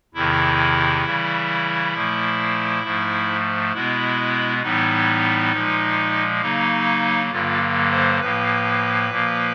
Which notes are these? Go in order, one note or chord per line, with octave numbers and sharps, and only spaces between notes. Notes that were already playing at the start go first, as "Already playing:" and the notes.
E2 C3 D#3 E4
C#3 E3 G3
A#2 F3 A3
G#2 F3 A3
B2 G#3 B3 E4
A2 E3 G3 B3 D#4
A#2 F3 G#3
C#3 F#3 A#3 D#4
G2 D3 F#3 A#3 F4
C5
A2 F3 A#3 B4
A#2 F3 A#3